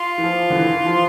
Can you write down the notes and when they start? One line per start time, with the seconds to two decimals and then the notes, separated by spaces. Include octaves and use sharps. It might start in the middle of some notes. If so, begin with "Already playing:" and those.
Already playing: F4
0.18 E3
0.24 F3
0.50 D3
0.55 E3
0.75 E3
0.86 F3